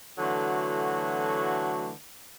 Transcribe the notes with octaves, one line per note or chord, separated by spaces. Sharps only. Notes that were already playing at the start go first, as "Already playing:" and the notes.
D3 E3 F#3 A3 F#4